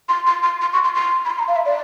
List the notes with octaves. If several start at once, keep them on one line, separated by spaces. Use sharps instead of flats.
C6
C6
C6
C6
C#6
C6
C6
B5
C6
A#5
F5
E5
D5